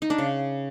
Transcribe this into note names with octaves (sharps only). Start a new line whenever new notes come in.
D#4
D4
C#3